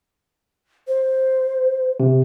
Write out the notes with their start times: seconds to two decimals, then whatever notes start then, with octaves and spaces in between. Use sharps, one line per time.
0.88 C5
2.00 C3